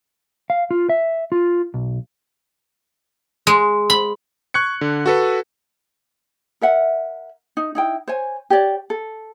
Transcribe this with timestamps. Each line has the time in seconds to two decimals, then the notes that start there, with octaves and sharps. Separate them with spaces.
0.50 F5
0.71 F4
0.89 E5
1.32 F4
1.74 B1
3.47 G#3
3.90 B5
4.54 C#6 F#6 G#6 C#7
4.81 D3
5.06 F#4 A4 B4
6.61 A#4 E5 F#5
7.57 D#4
7.75 D#4 E4 G5
8.08 C5 C#5 G#5
8.50 G4 C#5 D5
8.90 A4